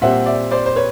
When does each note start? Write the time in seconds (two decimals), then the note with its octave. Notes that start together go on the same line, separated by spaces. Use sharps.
0.01 A#2 G3 C4 E5 F#5
0.26 D5 E5
0.51 C5 D5
0.66 C5
0.76 B4 C#5